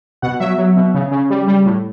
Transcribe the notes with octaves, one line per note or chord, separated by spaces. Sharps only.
B2 F#5
F#3 E5
F#3
B2
C#3
C#3
G3
G3
A2